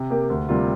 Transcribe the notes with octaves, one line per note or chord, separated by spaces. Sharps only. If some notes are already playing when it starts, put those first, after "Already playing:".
Already playing: C3
A#3 G4 A#4
D2
C3 G3 A#3 F4